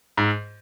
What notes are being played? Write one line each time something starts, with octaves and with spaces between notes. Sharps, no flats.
G#2